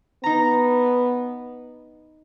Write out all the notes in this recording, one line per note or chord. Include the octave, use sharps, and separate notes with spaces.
B3 D#4 A#5